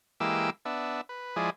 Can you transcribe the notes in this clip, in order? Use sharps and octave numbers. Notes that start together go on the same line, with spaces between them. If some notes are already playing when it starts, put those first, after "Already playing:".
E3 G#3 A#3 G4 D6 E6
B3 D4 E5
B4
F3 G#3 E4 G#4 D5